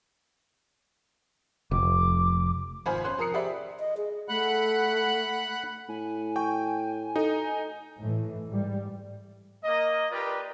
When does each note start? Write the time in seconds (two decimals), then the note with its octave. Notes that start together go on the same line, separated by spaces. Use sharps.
1.71 F1 D6
2.86 G#1 F4 C5 G#5 B5
3.04 C#4 C5 C6 F#6
3.18 F3 A#4 A#5 D#6 C7 C#7
3.34 G4 G#4 C5 D5 E5 B5
3.80 D#5
3.97 G#4
4.29 A3 F#5 B5 F#6
5.89 A2 G#5
6.36 G5 C#6
7.16 D#4 A4
8.00 A2 E3
8.49 G#2 G3
9.64 A#3 D#5
10.11 F4 G4 A#4 B4 D5